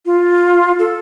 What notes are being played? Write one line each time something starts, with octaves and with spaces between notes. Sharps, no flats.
F4
A4